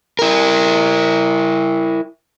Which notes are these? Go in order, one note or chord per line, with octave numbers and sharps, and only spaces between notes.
E4 A#4